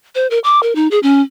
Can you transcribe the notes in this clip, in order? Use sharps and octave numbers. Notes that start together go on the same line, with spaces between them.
C5
A#4
D6
A#4
D#4
G#4
C#4